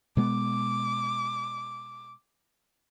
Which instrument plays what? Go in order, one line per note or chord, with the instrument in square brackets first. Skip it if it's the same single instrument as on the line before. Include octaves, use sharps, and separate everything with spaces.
[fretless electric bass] B2 G#3 B3 [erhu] D6